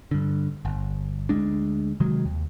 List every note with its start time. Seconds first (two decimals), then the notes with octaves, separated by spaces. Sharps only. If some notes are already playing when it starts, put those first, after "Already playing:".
0.11 G2 D3
0.65 G1
1.29 D2 G#3 D4
2.00 C3 D#3 F#3 G#3
2.25 D#2